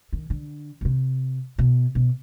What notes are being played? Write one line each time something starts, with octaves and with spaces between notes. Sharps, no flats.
D#3
D3
B2
C3
B2
B2